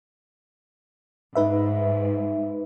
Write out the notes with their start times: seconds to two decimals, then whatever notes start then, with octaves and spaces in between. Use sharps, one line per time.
1.36 G#2 D#4 B4 E5